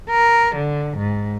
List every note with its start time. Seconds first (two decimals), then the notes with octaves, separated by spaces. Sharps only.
0.10 A#4
0.55 D3
0.98 G#2